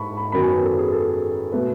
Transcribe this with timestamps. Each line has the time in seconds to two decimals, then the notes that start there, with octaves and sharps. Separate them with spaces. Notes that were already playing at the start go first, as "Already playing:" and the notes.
Already playing: G#2 A5 B5 C#6
0.17 B5
0.32 F#2 D#3 F#3 B3 B5
0.42 G#5
0.53 B4
0.63 A4
0.78 G#4
0.92 A4
1.52 B2 A3 B4